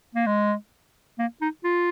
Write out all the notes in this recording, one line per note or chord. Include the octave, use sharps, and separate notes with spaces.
A#3
G#3
A#3
D#4
F4